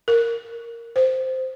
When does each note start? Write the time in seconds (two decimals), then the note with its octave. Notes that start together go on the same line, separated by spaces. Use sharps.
0.08 A#4
0.96 C5